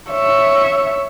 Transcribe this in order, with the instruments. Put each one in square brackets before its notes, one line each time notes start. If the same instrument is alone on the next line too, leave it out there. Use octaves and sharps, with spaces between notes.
[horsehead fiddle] C#5 E5